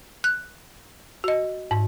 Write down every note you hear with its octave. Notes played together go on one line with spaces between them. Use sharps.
F#6
F#4 D#5
G#2